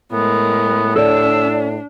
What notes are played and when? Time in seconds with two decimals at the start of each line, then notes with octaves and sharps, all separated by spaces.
0.12 A2 G#3 B3 A#4
0.96 D4 A4 C#5 D5 E6